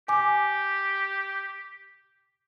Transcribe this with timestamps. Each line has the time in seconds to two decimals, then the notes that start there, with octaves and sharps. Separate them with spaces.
0.08 G4 G#5 D6